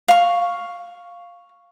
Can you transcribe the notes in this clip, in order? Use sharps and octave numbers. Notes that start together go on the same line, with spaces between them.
F5 C#6